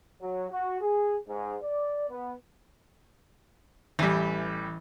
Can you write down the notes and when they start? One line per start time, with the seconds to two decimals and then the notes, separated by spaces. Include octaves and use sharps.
0.22 F#3
0.51 F#4
0.81 G#4
1.28 G#2
1.62 D5
2.09 B3
3.99 A1 E3 G3